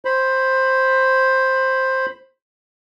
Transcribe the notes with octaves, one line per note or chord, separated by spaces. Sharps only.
C5 B5